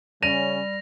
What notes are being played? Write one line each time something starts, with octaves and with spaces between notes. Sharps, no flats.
C#3 G3 C#4 A#6 D#7 F7